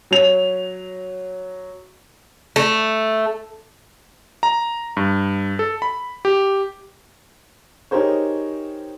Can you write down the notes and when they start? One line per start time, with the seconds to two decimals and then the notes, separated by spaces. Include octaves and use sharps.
0.11 F#3 F7
2.56 A3
4.43 A#5
4.97 G2
5.59 A4
5.82 B5
6.25 G4
7.91 D#4 G4 G#4 A#4 C5 C#5